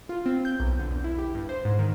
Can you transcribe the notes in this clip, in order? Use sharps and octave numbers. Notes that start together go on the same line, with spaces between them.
F4
C4
G6
B1
D3
E2
E4
G4
G2
C5
G#2
D#3